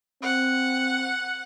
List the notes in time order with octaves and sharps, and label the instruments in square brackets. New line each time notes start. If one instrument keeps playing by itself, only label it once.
[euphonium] C4 [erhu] F#5